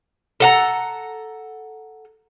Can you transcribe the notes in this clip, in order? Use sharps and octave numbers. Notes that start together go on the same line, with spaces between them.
A4 F#5 A#5